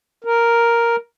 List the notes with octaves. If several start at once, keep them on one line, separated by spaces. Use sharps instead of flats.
A#4